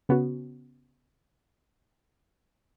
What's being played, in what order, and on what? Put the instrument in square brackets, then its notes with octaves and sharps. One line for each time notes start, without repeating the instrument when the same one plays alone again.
[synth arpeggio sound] C#3 B3 C#4 F#4